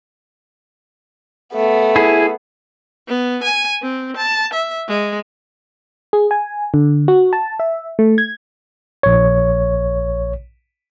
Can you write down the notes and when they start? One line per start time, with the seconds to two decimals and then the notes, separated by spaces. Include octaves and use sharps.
1.55 A3 B3
1.96 E4 G#4
3.07 B3
3.43 G#5
3.82 C4
4.17 A5
4.53 E5
4.88 G#3
6.13 G#4
6.31 G#5
6.74 D3
7.08 F#4
7.33 A5
7.60 E5
7.99 A3
8.18 G#6
9.03 A#1 C#5